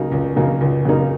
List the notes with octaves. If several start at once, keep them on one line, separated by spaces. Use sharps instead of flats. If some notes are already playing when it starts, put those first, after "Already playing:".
Already playing: C#2 C#3 F#3 A#3 D#4
C#2
C#3 F#3 A#3 D#4
C#2
C#3 F#3 A#3 D#4